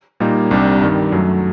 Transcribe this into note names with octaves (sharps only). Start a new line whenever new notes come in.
A#2 G3 A#3 D#4
C2 C3 G3 D4
G2 D#3 G3
F#2 F#3 A3